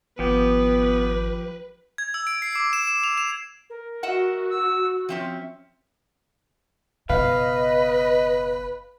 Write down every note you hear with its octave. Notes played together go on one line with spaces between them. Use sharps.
G#1 F3 B3 G4 B4
G#6
E6
D7
C7
D6
E7
E7
F7
E7
A#4
F#4 D#5 E5 F#5
E6
F3 C4 C#4 E5
F#1 B2 B4 D#5 F5